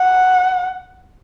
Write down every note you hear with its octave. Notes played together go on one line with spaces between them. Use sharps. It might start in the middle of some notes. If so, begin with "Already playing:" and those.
Already playing: F#5